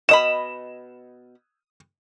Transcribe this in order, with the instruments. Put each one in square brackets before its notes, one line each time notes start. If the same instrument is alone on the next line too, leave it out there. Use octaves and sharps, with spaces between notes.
[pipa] B2 D#5 B5 [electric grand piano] E7